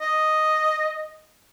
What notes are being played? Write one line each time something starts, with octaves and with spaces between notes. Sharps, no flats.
D#5